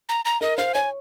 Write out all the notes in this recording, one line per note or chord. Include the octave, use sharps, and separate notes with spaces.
A#5
A#5
A#4 D#5
C5 F5
C#5 G#5